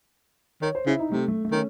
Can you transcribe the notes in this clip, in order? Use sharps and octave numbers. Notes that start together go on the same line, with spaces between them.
D#3 C#5
C5
C#3 E4
D#4
C3 A3
A3
A3
D#3 C#4